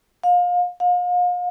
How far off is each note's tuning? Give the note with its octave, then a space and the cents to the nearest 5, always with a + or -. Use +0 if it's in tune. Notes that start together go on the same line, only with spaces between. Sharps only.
F5 +30
F5 +40